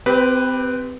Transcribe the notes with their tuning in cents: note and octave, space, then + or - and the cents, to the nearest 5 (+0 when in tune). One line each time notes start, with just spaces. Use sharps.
C4 -30 G4 +10 B4 +0